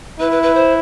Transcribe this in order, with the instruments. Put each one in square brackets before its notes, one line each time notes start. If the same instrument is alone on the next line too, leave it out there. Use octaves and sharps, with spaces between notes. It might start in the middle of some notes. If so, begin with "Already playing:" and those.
[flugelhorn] E4 [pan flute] B4
[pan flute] B4
B4
C5